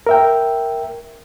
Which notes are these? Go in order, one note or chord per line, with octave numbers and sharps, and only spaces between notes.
A#4 E5 G5